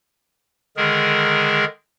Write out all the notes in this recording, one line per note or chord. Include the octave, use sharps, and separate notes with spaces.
D3 D#3 G#3 G#4 A#4